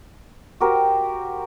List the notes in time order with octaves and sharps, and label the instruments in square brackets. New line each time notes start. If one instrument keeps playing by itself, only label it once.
[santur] F#4 G4 A#4 C5